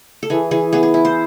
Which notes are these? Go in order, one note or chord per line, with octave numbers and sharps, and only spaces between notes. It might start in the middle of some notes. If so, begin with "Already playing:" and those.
A4
E3 G#4
E3 G#4
B3 G#4
G#4
E4
C5